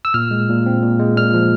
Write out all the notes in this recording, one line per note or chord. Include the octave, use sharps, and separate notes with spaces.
E6
A#2 F6
G#3
A#2
C4
A#2
G#3
A#2 F6
F3